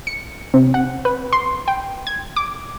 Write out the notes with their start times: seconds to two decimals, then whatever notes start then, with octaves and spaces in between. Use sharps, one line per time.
0.07 C#7
0.54 C3
0.74 F#5
1.05 B4
1.33 C6
1.68 G5
2.07 G#6
2.36 D6